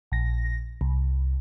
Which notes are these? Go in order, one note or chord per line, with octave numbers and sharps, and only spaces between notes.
A#1 A#6
C2